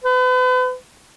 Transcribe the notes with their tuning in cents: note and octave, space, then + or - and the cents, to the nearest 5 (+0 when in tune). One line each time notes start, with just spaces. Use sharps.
B4 +40